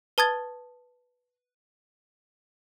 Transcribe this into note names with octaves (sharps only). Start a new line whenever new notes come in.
B4 A5 D#6 G#6 A6